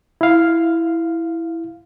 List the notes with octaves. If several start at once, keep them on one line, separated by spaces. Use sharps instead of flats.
E4 F5